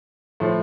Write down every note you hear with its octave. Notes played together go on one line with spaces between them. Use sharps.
A2 F3